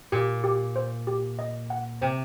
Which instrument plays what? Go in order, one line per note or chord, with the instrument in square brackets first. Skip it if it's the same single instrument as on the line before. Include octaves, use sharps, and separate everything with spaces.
[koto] A#2 [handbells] G4
[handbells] G4
C5
G4
D#5
F#5
[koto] C3 [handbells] C5